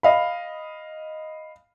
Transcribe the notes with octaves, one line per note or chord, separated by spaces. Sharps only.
D#5 F5 B5